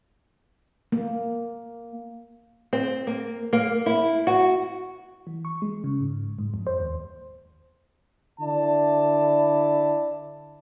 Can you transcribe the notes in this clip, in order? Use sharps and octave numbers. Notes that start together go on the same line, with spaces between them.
A#3
C4
A#3
A#3
E4
F#4
E3
C#6
G#3
C#3
G#2
G#2
F2
C5
D#2
D3 E4 D5 A5